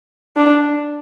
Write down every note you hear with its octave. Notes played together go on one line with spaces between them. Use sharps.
D4